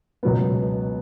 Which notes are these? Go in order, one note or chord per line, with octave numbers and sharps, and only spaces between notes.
C#2 B2 F#3 B3